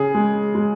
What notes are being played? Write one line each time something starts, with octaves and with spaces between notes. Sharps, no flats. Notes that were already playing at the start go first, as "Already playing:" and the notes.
Already playing: C#3 G#4
G#3
G#3